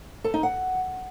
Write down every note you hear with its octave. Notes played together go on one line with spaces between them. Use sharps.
A4
D#4
F#5